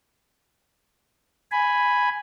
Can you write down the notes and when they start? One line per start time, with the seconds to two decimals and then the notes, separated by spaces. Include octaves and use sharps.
1.51 G#5 B5